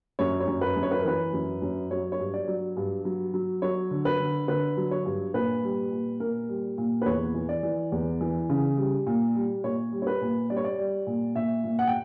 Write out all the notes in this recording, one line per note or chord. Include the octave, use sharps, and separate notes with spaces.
F#2 C#5
C#5
F#2
B4
F#2
C#5
B4
A#4
E3 B4
F#2
F#2
F#3 C#5
C#5
G2
D5
F#3
G2
F#3
F#3
F#3 C#5
D3
B4
D3
D3 B4
F#3
C#5
G2
A#2 B4
G3
A#2
A#2 A#4
G3
A#2
B4
E2 C#5
E3
D5
E3
E2
E3
C#3
G3
A#2
G3
A#2 C#5
G3
C#5
B4
A#2
G3 D5
C#5
D5
G3
A#2
A#2 E5
A#2
F#5
G5